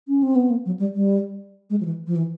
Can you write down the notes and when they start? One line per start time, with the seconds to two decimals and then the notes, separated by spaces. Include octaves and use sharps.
0.08 C#4
0.23 C4
0.36 B3
0.50 A#3
0.66 F#3
0.80 G3
0.95 G3
1.70 G#3
1.81 F3
1.85 E3
2.07 F3
2.16 E3